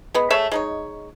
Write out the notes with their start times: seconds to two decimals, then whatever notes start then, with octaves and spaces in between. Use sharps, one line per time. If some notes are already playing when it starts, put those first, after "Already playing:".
0.14 G#3 B3
0.31 A3 G#4 C#5 E5
0.52 G#3 D#4 C#5